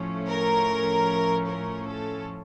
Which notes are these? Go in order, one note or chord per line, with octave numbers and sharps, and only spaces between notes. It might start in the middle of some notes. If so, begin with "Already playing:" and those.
Already playing: A2 F3 A3 C#4
A#4
A#4
A4